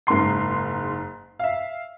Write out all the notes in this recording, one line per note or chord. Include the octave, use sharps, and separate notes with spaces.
F#1 G#2 A#4 C6 C7
E5 F5